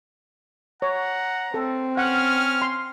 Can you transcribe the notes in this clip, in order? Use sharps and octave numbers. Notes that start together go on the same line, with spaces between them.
C#5 F#5 A#5
C4 A4
C#4 F#5 F6
C6